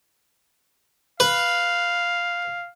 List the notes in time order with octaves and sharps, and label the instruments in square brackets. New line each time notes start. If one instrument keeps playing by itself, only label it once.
[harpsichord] B4 [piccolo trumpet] F5